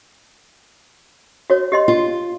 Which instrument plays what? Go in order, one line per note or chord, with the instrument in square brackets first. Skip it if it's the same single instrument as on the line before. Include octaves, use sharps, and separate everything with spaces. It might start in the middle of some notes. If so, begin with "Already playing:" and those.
[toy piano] F#4 C#5
G4 D#5 C6
[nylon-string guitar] F4